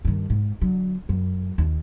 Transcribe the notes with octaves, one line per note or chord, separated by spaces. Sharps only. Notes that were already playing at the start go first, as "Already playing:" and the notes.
G2 D#3
G#2
D3 F#3
F#2
D#2